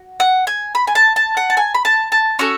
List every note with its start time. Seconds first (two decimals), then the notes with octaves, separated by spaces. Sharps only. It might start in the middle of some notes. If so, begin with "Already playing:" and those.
Already playing: F#4
0.20 F#5
0.47 G#5
0.75 B5
0.87 G#5
0.95 A5
1.16 A5
1.37 F#5
1.50 A5
1.57 G#5
1.74 B5
1.85 A5
2.12 A5
2.39 C#4 F#4 A4 C#6